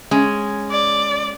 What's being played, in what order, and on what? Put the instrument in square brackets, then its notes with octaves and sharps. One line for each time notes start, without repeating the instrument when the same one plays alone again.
[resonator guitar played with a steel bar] G#3 C#4
[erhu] D5